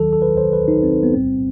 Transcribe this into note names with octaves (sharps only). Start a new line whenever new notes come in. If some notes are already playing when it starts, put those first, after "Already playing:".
Already playing: D#2 D#3 F#3 A4
A4
B4
C5
B4
D#4
C4
B3
B1 A2 G3 C4